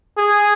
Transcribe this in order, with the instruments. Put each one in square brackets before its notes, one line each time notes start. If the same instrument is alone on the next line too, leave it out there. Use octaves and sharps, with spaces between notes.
[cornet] G#4